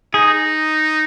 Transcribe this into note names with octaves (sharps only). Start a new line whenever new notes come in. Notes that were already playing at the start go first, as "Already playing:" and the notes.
D#4 G#4